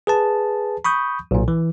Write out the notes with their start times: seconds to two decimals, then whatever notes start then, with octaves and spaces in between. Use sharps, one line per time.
0.07 G#4 B4 A5
0.85 B5 C#6 D#6 G6
1.31 B1 A#2
1.48 E3